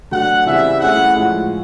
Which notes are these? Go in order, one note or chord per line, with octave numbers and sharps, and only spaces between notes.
D3 F#3 A3 F#5
C#3 E3 G3 C4 E5
E3 A3 C#4 E4 G#4 F#5
A2 F3 G#3